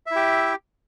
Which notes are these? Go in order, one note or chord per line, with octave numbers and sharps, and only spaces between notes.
E4 G4 E5